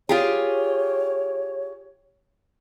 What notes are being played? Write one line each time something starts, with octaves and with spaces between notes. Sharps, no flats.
F4 G4 G#4 C#5